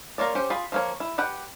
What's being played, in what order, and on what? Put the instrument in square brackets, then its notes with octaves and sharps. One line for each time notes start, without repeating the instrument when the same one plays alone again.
[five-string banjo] A#3 F4 C#5 D5
C#4 G4 C5 G5
F4 G#4 B5
F3 A#3 C#5
E4
G4 B4 F#5 G5